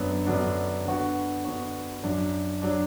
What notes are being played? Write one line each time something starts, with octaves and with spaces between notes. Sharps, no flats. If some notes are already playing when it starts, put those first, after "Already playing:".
Already playing: F#2 D3 F#3 B3 D4
F#2 D3 F#3 B3 D4
D3 B3 D4 F#4
D3 B3 D4 F#4
F#2 F#3 D4
F#3 D4